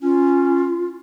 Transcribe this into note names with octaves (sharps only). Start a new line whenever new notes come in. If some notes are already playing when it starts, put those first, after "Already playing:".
C#4 F4